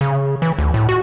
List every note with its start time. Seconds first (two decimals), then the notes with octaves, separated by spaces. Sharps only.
0.01 C#3
0.42 E3
0.59 D2
0.74 A2
0.89 F#4